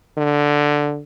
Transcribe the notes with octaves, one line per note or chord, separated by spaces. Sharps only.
D3